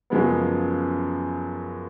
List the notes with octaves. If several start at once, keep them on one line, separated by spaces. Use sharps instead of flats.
F#2 C#3 F3 G#3 B3